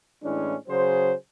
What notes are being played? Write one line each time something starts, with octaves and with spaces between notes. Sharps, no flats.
A2 E3 G#3 C#4 D4
C#3 F#3 G#4 C5